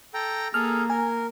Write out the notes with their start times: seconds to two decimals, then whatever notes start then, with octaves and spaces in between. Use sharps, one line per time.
0.14 A4 G5 A#5
0.54 A#3 G#4 A4 F6
0.90 A#4 G#5